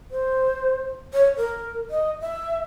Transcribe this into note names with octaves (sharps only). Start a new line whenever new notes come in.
C5
C#5
A#4
D#5
E5